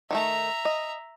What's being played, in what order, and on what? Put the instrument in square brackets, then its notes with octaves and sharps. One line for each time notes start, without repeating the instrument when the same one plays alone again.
[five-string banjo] D#3 G3 A3 [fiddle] E5 A#5
[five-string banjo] D#5